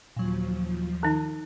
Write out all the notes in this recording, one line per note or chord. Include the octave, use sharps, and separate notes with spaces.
D#2 A#2 F3 F#3
D#3 D#4